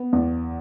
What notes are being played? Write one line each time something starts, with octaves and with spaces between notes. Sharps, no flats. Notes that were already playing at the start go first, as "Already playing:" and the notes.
Already playing: B3
E2